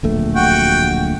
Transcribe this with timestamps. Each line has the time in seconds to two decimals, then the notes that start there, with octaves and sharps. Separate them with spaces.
0.03 D1 A#1 A3
0.35 F#4 G5